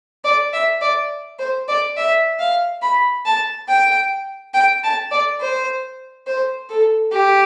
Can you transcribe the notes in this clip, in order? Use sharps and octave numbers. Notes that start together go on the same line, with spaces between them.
D5
E5
D5
C5
D5
E5
F5
B5
A5
G5
G5
A5
D5
C5
C5
A4
G4